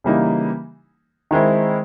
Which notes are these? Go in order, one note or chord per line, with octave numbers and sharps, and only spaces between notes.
C#3 E3 G3 A#3 D#4
D#3 G#3 C4 E4